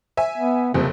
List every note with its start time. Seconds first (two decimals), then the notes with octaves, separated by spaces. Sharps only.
0.17 E5 G#5
0.38 B3
0.74 F#1 F2 C3